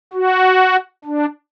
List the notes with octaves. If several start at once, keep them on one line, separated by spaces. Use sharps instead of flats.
F#4
D4